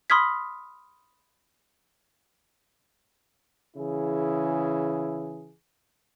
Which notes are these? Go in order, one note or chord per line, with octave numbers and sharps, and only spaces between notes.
B5 C6 D#6 F6 G#6 B6
C#3 E3 E4 G#4